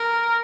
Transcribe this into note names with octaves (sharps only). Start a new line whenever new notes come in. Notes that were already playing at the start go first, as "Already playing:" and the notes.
Already playing: A#4